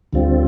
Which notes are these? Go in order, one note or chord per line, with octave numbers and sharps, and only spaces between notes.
D2 D3 G3 C4 F4